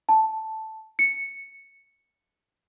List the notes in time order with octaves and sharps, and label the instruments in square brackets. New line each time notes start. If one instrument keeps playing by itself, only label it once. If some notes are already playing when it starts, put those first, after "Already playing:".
[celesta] A5
C#7